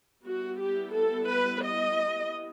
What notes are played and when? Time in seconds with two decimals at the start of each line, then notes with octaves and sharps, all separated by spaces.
0.25 G3 B3 E4 F#4
0.59 G4
0.93 A4
1.28 B4
1.63 D#5